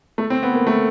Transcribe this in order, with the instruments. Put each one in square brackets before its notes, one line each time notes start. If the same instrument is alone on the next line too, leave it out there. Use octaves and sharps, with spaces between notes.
[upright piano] A3
C4
B3
A#3
A3